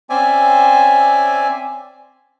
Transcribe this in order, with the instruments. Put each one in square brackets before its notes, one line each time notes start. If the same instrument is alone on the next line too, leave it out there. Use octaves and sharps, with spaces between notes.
[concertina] C4 C#4 D5 E5 G#5